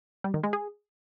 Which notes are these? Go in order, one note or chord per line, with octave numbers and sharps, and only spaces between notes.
G3
D#3
G#3
G#4